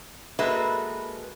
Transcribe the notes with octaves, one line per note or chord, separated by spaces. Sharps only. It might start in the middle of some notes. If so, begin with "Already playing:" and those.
G#3 A#3 F#4 A4 B4 E5